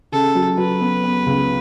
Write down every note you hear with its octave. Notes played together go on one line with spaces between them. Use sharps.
C#3 A4
F#3
F#3 B4
B3
B3
C#2